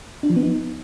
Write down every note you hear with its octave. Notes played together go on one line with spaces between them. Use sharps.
D4
F3
B3
D#4